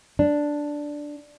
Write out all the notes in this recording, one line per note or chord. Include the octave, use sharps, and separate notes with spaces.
D4